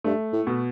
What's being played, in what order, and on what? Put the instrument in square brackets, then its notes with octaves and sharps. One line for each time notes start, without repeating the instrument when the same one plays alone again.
[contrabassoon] G2 [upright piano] A3
[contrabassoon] A2
[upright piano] B2